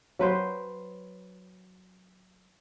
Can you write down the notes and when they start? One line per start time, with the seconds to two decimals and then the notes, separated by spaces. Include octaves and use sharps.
0.19 F#3 B4 C5 G5